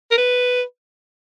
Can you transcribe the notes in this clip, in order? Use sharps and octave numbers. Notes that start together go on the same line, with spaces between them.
A#4
B4